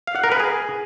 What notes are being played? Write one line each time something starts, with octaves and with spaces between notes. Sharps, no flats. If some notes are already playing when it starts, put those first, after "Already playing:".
F5
F#5
A#4
B4
G#4